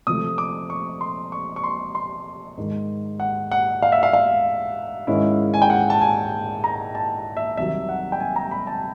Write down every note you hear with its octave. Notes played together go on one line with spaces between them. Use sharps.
C3 F3 A3 D#6
D6
C#6
C6
C#6
C#6
C6
C6
G#2 D#3 G#3
F#5
F#5
F5
E5
F5
F5
G#2 D#3 G#3 C#4 E4
G#5
G5
F#5
A5
G#5
A#5
A5
E5
C2 C3 D#3 F#3 E5
F#5
G5
G#5
A#5
B5
A5